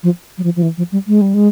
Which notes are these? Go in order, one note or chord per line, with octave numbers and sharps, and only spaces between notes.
F3
F#3
F3
F3
E3
F3
G3
G#3
G3
G#3